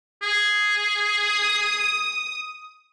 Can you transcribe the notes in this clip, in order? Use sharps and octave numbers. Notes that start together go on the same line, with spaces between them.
G#4
D#6